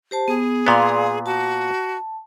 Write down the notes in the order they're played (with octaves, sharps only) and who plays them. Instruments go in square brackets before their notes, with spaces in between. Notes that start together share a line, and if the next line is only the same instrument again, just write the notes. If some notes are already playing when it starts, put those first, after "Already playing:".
[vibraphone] G4 C5 A5
[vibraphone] B3 [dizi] G#4
[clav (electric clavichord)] A#2 B3 [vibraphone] D5 F5 C6
[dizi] F#4 [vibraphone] A5